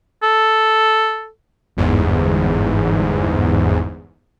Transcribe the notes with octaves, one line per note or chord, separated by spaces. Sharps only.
A4
G1 E2 G#2